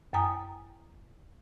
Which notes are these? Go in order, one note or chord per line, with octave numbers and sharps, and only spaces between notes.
F#2 G#5 A#5 D#6